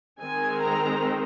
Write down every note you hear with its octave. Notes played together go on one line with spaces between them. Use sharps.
D#3 G#3 C4 G#5
A#5